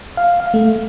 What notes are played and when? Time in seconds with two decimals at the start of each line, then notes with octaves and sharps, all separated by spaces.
0.17 F5
0.40 F5
0.54 A3